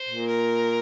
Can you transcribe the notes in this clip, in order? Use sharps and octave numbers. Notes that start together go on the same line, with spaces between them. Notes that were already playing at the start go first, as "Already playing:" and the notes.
Already playing: C5
A#2
A#4